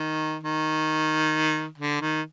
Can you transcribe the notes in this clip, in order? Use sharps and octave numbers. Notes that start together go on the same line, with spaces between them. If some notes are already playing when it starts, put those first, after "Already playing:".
Already playing: D#3
D#3
D3
D#3